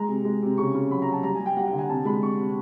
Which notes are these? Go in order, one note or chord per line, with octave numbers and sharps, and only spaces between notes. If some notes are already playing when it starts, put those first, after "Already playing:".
Already playing: G#3 A#5
C3
G#3
C3
C#3 C#6
C#3
F#3 B5
A#5
F#3
A5
G3 A#5
G3 G#5
G5
G3 F#5
F#5
D3
G#5
C3 A5
G#3 B5
C3 C#6
C3